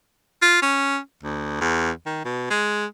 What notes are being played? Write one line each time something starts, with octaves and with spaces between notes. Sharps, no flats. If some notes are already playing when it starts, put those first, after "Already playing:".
F4
C#4
D2
E2
D#3
B2
G#3